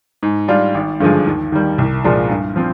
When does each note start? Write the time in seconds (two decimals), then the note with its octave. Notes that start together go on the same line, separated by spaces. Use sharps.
0.23 G#2
0.48 G3 D4 F4
0.75 G#1
1.00 G2 D3 F3 G#3
1.26 D#2
1.52 D#3 G3
1.78 C2
2.04 A#2 F3 G#3 D4
2.30 G2
2.56 F3 C4